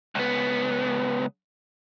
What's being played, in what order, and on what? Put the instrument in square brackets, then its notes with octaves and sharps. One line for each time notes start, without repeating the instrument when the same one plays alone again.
[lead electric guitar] C#2 B3